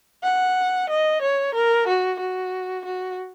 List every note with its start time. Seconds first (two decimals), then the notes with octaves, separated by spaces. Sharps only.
0.24 F#5
0.90 D#5
1.22 C#5
1.54 A#4
1.87 F#4
2.19 F#4
2.85 F#4